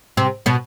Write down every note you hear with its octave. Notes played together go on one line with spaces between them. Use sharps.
C3 C4
B2 B3